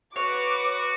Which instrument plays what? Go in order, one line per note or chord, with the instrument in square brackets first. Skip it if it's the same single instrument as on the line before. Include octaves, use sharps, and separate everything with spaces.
[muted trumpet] F#4 [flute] B4 [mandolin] C#5 [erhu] D6